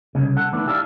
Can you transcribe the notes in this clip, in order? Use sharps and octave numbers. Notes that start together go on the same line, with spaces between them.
C2 C#3
A4 F#5
D#3 E3 A3 B3 D4
E4 G4 A4 A#4 D5 F5